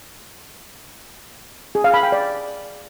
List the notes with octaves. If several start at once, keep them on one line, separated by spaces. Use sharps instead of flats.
G#4
F5
B5
G5
D5